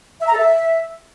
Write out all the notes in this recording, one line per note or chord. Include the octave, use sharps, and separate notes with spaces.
E5
A#5
A4
E5